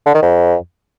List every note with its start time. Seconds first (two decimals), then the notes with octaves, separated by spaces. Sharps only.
0.06 D3
0.14 D#3
0.22 F2